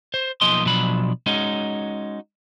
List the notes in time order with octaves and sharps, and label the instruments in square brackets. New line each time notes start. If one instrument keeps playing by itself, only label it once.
[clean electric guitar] C5
B1 F3 A#3 D#4 D#5 C6
B2 F3 F#3 D4 B5
G#3 C#4 D#4 F#4